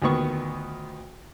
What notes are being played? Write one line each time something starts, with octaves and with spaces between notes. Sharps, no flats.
D2 A#2 D#3 B3 C#6